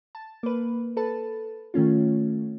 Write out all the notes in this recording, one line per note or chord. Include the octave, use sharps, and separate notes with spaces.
A5
A#3 B4
A4 B4 A5
D#3 A3 C#4 F4